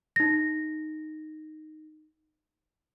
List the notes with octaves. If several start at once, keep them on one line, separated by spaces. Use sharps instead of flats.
D#4 A#6